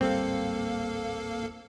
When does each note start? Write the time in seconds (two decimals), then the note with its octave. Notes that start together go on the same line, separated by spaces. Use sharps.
0.01 D1 G#1 G3 A#3 C4 A4 F5